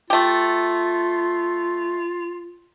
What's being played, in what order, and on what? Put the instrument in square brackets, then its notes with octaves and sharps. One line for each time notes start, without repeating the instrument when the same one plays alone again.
[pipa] A3 G4 [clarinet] F4